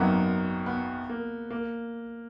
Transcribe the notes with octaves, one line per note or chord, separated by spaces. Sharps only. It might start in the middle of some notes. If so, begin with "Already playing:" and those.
Already playing: G#1 F#2 D#3 F#3 A#3 B3
B3
A#3
A#3